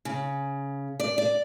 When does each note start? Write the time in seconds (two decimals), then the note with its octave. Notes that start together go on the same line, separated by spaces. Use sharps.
0.05 C#3
1.00 D5
1.18 D5